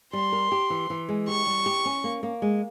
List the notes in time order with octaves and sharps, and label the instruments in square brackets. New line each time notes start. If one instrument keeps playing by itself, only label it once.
[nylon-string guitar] G3 [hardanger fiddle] C6
[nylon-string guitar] A#4
G4
E3
E3
G#3
[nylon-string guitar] G4 [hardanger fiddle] C#6
[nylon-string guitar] G3
G4
C#4
A#3
A#3
G#3